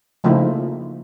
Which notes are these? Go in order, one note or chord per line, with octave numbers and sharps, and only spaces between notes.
C#3 F3 A3 A#3 D#4 E4